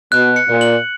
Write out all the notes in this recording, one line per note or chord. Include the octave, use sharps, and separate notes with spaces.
B2 F#6
C#7
A#2
F#7